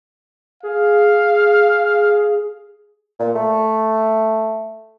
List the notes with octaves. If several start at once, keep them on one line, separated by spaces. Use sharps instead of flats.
G#4 F5
A#2
A3